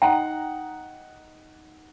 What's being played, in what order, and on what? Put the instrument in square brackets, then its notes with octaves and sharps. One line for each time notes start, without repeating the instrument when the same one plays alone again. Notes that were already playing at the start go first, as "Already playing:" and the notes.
[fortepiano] D#4 F#5 A#5 [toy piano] G5